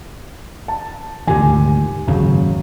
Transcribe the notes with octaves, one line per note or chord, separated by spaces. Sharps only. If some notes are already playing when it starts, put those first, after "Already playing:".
A5
D2 G#2 D#3 G4 G#5
F#1 D#2 G#2 C#3 F#3